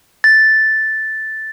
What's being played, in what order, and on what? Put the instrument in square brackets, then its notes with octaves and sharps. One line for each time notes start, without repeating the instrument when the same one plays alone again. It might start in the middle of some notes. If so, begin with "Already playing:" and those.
[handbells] A6